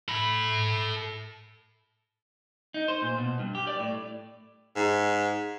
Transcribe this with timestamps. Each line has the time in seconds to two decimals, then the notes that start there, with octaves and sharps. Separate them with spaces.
0.09 A4 B5
2.74 D#4
2.88 C5
3.02 A#2
3.18 B2
3.39 G2
3.55 G4
3.67 D5
3.79 A2
4.76 G#2